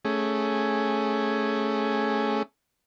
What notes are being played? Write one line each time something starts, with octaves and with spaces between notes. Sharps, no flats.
A3 C#4 G#4